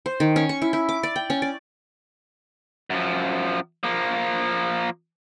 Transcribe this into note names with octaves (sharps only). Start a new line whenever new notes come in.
C5
D#3
C#4
C#6
E4
E4
D6
D5
G5
C#4
D5
F#2 F3
F3 A#3